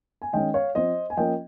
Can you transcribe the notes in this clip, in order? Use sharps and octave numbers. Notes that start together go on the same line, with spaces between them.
G#5
D#3 G#3 C#4 D#5 G5
C#5 F5
F3 C4 C5 D#5
G#5
F3 A#3 C#4 D#5 G5